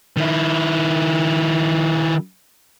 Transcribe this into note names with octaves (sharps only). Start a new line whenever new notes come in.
D#3 E4